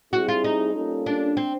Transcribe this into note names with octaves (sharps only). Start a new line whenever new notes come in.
G3 C4 E4 F#4 G#4
F4
D#4
G3 A#3 C#4 F4 A4
D4
C4